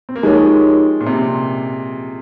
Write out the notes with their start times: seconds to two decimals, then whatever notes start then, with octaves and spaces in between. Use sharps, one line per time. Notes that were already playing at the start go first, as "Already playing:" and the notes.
0.09 C4
0.16 A#3
0.23 F3 G#3 D#4 G4 A#4 C#5
1.01 A#2
1.06 C3